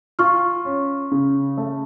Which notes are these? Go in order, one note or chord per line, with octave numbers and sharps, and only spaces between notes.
F4 C#6 F6
C#4
C#3
A3